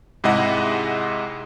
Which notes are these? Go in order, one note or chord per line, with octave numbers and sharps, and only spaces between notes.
G#2 C3 G#3 E4 D#5 F#5